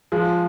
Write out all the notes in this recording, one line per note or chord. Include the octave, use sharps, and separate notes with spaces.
F3 G#3